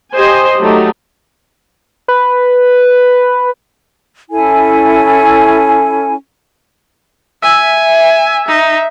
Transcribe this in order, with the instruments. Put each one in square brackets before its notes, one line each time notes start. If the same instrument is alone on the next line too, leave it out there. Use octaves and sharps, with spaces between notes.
[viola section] G4 C5 D#5 G#5
F#3 A3 D#4 G4
[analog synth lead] B4
[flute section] C#4 E4 A4 G#5
[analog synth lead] E5 [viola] G#5
[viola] D#4